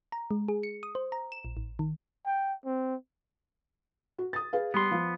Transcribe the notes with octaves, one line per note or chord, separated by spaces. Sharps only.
A#5
G#3
G#4
C#7
D#6
C5
A#5
E7
A#1
A1
D#3
G5
C4
F#4
D#6 A6
G#4 B4 F5
G3 B3 C6
F3 F5